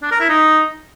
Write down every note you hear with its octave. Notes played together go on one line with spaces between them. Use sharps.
D4
A#4
E4
D#4